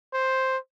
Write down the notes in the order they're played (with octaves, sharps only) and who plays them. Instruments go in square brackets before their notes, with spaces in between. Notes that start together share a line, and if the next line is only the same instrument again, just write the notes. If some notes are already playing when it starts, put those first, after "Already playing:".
[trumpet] C5